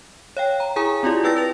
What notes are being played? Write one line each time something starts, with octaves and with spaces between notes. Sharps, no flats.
C#5 F5 G5
A#5
E4 G#4 G#5 A#5 D#6
C4 E4 F4 G4 D5
E4 B4 G5 E6 A6 A#6
B4 F7